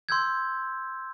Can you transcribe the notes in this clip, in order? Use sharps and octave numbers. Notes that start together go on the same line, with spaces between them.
C6 E6 G6 G#6